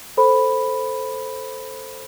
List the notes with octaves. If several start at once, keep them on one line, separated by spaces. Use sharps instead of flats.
A4 C5 B5